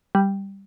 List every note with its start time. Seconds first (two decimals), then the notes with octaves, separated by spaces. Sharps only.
0.15 G3